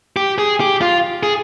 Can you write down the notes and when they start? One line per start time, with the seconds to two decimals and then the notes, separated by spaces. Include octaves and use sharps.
0.16 G4
0.38 G#4
0.60 G4
0.81 F4
1.23 G#4